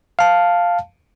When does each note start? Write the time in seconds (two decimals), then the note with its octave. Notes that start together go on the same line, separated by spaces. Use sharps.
0.19 F5 A5